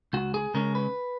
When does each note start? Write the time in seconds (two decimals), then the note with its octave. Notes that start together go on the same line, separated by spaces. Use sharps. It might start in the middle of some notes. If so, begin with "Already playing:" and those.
0.13 C#2 F#4
0.34 G#4
0.54 C#3 G#3 C#4 A#4
0.75 B4